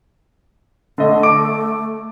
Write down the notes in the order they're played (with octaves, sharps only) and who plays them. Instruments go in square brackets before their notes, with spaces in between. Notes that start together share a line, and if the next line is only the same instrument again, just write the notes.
[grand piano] D3 D#5 [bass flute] A3
[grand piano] D6 D7